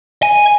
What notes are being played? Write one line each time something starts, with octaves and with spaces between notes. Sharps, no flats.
G#5